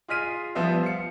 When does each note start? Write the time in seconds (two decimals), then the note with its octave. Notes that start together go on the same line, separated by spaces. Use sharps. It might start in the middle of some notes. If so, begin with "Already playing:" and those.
0.08 F4 G#4 D#5 F6 B6 D#7
0.55 F3 G3 B3 C5 D#5 E5
0.83 F5 C#7